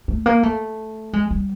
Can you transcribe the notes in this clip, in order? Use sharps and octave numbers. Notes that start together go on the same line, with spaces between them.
A3
A#3
A3
G#3
G3